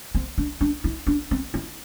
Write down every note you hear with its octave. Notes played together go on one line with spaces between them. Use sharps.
C4
D4
D4
E4
D4
C4
E4